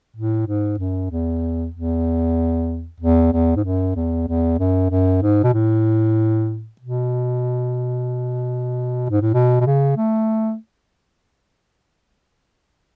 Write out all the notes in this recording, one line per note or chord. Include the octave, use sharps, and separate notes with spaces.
A2
G#2
F#2
E2
E2
E2
E2
G#2
F#2
E2
E2
F#2
F#2
G#2
B2
A2
B2
G#2
A2
B2
B2
C#3
A3